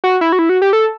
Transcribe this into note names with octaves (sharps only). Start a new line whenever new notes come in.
F#4
E4
F#4
E4
F#4
G4
A4